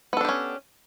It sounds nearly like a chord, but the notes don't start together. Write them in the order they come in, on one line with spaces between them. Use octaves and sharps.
B3 A4 D4 G4 C#4